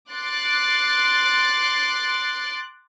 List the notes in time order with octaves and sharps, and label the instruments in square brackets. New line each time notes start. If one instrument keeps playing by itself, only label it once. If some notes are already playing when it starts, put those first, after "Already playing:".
[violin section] C6 D6 F#6 A6 C7 D7